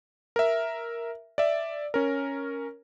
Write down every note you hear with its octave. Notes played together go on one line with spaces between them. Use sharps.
A#4 E5
D5 E5
C#4 A#4